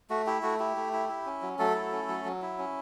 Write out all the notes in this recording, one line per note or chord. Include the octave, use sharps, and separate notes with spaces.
A3 F#4
E4 G4
A3 F#4
E4 G4
A3
E4
E4
C#4
F#3
F#3 A3 A4
E4
C#4
F#3
F#3
E4
C#4